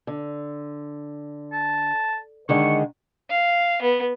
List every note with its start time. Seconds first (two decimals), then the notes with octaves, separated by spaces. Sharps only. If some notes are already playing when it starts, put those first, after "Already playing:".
0.07 D3
1.52 A5
2.49 D3 D#3 G#3 C#6
3.30 F5
3.82 B3